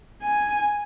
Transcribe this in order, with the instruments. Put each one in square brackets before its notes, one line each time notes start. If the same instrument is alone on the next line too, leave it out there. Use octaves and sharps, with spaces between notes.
[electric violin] G#5